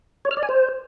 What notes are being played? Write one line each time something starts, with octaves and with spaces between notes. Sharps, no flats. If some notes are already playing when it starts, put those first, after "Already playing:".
C#5
F6
D5
G#5
C5